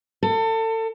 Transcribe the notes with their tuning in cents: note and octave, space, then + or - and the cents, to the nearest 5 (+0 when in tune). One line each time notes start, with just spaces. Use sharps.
A4 +30